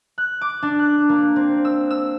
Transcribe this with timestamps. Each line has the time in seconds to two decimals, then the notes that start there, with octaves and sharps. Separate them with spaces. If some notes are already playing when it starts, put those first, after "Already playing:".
0.18 F#6
0.41 D6
0.63 D4
0.79 F#6
1.09 A#3
1.36 C4
1.65 E6
1.91 E6